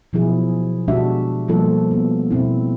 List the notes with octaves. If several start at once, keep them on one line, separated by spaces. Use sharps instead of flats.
B2 F3 F#3 E4 G#4
B2 G#3 D4 F#4 G4 E5
B2 F3 G3 A#3 F4 A4
B3
B2 C4 E4